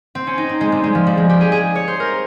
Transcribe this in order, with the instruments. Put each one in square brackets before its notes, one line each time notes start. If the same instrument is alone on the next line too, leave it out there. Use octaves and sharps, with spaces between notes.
[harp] C4
C#4
D#4
C4
G#3
G3
G#3
F3
G3
G#3
G4
G#4
G#4
C#5
C5
A#4